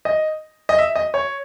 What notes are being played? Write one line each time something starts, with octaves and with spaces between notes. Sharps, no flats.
D#5
D#5
E5
D#5
C#5